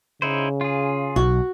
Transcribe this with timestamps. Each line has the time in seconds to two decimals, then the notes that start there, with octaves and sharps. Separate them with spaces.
0.22 C#3 D#4 E4 C5
0.61 F4 G#4
1.16 B1 F#4